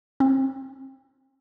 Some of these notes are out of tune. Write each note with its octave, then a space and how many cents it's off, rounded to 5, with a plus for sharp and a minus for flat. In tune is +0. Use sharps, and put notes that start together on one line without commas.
C4 +35